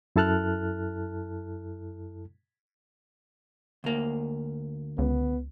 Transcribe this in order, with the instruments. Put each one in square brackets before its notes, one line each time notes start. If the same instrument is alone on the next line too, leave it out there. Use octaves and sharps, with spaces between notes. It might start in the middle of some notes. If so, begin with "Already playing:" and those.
[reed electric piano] F#2 E4 A4 A5 F6 F#6
[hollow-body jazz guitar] D2 A#3
[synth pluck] C#2 [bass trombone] B3